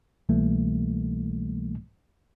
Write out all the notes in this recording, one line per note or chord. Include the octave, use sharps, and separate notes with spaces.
C2 B2 E3 G3 A3 A#3